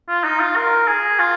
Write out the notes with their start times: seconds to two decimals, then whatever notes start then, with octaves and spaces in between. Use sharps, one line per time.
0.09 F4
0.24 D#4
0.40 F4
0.56 A#4
0.87 G#4
1.19 F4